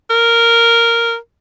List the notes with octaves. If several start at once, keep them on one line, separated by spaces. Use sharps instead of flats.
A#4